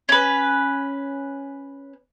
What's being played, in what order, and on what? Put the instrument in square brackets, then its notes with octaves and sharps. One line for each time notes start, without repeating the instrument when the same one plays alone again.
[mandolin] C#4 B4